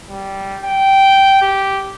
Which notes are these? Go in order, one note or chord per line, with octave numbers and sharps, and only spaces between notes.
G3
G5
G4